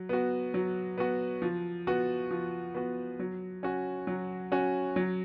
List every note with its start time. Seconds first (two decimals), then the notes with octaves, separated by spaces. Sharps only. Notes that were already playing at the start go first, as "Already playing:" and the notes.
Already playing: F#3
0.09 B3 F#4
0.54 F#3
0.98 B3 F#4
1.42 F3
1.87 B3 F#4
2.31 F3
2.75 B3 F#4
3.20 F#3
3.63 C#4 F#4
4.07 F#3
4.52 C#4 F#4
4.96 F#3